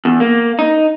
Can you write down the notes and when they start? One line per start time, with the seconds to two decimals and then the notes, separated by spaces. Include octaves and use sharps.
0.05 E2
0.20 A#3
0.59 D#4